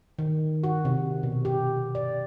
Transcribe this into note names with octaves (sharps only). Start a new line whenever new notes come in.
D#3
F#4
C3
B2
G4
D5